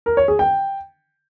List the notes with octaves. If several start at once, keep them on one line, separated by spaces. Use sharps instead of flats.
A#4
C#5
G#4
G5